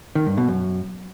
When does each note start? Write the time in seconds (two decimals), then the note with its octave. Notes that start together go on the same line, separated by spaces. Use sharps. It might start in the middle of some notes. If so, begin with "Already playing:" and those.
0.15 D#3
0.26 G2
0.38 B2
0.49 F#2